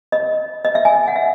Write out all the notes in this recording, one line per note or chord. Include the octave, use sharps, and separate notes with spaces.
D#5
D#5
E5
G#5
F#5
E5